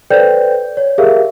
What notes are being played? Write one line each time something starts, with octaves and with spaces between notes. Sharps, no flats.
A4 B4 C5 D5 G5 G6
C#5
G4 G#4 A#4 E5 F5